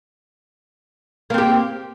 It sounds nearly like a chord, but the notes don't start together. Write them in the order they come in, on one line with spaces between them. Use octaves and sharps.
A#3 C4 G4